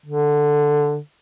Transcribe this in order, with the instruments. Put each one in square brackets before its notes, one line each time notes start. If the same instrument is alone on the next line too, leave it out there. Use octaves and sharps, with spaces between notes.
[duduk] D3